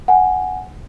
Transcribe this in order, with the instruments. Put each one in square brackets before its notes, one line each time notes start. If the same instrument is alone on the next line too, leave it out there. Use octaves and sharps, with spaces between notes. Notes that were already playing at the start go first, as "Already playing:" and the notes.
[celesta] F#5 G#5